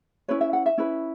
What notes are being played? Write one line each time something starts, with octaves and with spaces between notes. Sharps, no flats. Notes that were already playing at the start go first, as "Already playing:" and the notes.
C#4 E4 B4 C#5
E5
F#5
E5
C#4 E4 B4